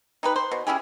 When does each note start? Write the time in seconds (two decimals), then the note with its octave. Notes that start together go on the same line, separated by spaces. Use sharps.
0.23 D#4 G4 B4
0.36 C5
0.51 B2
0.67 C#4 E4 G4 G#4